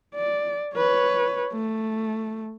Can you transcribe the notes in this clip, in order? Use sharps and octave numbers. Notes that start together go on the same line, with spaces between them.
D5
B4 C#5
A3